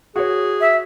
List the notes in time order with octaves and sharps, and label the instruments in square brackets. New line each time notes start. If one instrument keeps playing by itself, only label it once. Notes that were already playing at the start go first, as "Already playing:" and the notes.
[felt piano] F#4 C#5 [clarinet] G#4
[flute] E5